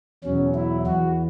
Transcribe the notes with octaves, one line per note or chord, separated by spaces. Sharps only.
E2 B2 F#3 C#4
E4
E2 E3 F#4